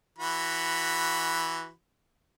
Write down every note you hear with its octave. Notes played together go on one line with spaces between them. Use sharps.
E3 F#4 B5